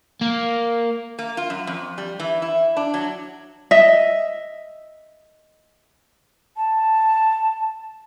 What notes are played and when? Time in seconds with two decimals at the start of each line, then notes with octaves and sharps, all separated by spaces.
0.21 A#3
1.19 A#3
1.37 F4
1.50 F#2
1.67 F2
1.98 G3
2.20 E3
2.42 E4
2.77 D4
2.94 F#3
3.71 D#5 E5
6.57 A5